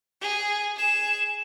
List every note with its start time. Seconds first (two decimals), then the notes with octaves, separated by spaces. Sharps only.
0.21 G#4
0.76 G#4 E7